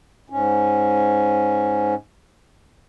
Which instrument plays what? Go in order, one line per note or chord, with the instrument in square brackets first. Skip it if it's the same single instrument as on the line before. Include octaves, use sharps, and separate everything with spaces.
[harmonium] G#2 C#4